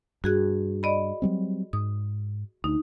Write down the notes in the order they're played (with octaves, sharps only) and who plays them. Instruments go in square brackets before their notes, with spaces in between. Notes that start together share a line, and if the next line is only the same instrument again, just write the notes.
[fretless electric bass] G2 [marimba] F#4 G#4 F#6
[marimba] D5 D#5 B5
[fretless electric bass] F#3 G3 C4
[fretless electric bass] G#2 [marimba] D#6
[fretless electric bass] D2 [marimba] D#4